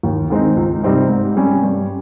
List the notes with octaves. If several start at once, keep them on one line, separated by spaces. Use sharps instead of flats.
D#2
D#3 G#3 C4 D#4
C#2
C3 G3 C4 D#4
G#2
G3 C#4
G2